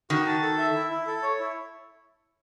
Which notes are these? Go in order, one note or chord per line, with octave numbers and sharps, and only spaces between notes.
D#3 F#4
A5
A4
E5
E4
E4
A4
C#5
E4